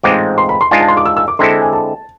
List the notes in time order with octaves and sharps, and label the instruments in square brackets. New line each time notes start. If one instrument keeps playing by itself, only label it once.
[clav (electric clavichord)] A1 G#2 G#3 C4 F4 [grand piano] D6
[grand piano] C6
B5
C6
[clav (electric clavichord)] G#2 G#3 D4 F4 [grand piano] G#5
[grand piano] A5
C6
D6
E6
E6
D6
[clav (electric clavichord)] D3 G#3 C4 E4 A4 [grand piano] C6
[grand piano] G#5
A5